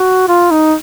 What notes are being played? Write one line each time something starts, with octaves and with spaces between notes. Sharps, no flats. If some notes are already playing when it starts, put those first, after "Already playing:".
Already playing: F#4
F4
D#4